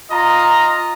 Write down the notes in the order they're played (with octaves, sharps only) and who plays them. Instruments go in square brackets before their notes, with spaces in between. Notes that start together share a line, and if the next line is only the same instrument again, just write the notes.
[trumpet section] F4 D#5 A#5